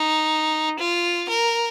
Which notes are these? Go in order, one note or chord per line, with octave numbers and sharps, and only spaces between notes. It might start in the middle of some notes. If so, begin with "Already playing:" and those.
Already playing: D#4
F4
A#4